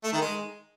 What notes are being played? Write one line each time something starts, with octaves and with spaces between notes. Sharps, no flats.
A3
D#3
G#3